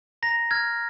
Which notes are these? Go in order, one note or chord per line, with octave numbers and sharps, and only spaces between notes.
A#5 A#6
F6 G#6